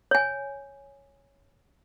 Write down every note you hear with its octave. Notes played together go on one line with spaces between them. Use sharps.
C#5 G#5